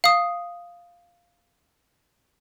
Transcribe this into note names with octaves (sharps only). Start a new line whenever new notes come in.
F5 D#6